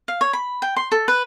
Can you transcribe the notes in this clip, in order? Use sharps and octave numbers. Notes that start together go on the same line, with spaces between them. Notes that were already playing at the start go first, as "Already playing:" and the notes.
F5
C#5
B5
G5
C6
A4
B4